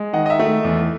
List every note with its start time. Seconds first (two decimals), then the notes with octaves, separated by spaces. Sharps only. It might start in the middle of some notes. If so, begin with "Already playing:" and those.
Already playing: G#3
0.13 D#3 D#5 F#5
0.26 D#5
0.30 E5
0.39 A3
0.64 E2